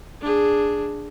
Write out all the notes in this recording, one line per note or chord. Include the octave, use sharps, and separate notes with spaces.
D4 G#4